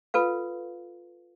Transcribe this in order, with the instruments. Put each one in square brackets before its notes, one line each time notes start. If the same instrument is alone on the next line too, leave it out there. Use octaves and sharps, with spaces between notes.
[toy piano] F4 A4 B4 F5